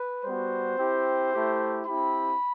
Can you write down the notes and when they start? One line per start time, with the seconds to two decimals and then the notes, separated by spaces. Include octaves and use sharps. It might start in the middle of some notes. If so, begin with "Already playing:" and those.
Already playing: B4
0.25 G3 B3 F#4 C5
0.78 C4 E4 G4
1.32 A3 E4 G4
1.85 C4 E4 G4 B5